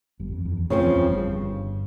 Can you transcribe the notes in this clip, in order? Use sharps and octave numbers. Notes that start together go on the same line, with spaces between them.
G1 G2
F2
F2
E2
F2 C#3 F3 C4
E2
F2
G1 G2